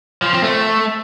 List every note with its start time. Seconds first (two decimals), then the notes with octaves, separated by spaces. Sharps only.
0.22 F3
0.33 C4
0.44 A3